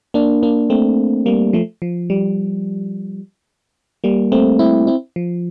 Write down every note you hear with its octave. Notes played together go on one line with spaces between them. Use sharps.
A#3 D4
A#3 D4
A3 C4
G3 A#3
F3 A3
F3
G3
G3 A#3
A3 C4
C4 E4
C4 E4
F3